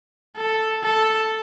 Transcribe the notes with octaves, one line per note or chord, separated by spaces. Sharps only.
A4
A4